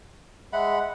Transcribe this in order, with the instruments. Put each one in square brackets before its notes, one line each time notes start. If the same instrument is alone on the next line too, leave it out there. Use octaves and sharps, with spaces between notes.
[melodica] G#3 F#5 B5 [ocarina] E5